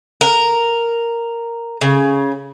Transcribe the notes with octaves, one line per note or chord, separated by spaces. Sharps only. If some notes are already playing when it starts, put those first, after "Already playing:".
A#4
C#3